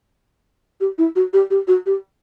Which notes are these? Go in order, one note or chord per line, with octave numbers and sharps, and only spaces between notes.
G4
E4
F#4
G4
G4
F#4
G4